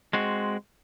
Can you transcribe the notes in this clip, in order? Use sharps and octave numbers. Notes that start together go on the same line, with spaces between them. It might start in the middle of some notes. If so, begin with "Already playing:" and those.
G#3 C4 F#4